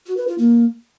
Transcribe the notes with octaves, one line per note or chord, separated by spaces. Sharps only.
F#4
B4
F4
A#3